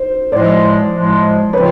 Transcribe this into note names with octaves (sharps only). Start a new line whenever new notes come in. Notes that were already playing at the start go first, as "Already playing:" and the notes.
Already playing: C5
A2 F3 G#3 C5 D5
A2 F3 G#3
C#3 F3 G#3 C4 F4 B4 C#5